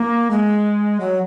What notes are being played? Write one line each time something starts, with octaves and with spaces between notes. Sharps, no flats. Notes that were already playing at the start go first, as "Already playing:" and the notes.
Already playing: A#3
G#3
F#3